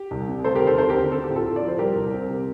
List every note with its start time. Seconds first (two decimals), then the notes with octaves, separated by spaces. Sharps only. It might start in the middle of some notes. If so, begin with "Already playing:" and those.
Already playing: G4
0.11 C2
0.28 C3
0.44 A3 A4 C5
0.56 G4 A#4
0.62 D#2
0.67 A4 C5
0.77 C4 A4 C5
0.89 G4 A#4
0.95 D3
1.11 C4 A4
1.24 A2 G4
1.36 F4 A4
1.46 A2
1.56 D5
1.62 F3
1.68 C5
1.78 G3 G4 A#4
1.96 C2
2.13 C4
2.29 C3